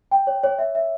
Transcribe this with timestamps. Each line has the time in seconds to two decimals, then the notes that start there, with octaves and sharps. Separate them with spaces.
0.11 G5
0.27 C#5
0.43 C#5
0.59 E5
0.75 E5